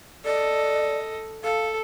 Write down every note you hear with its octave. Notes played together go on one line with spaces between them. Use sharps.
A4 D5 D#5
A4 F5